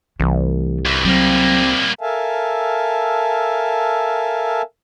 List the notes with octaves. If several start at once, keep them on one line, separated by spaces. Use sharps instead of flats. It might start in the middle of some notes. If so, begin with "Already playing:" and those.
C2 E3 A3
D2 E3
F#3 G3 A#3 C4
A4 A#4 E5 F5 G#5 A5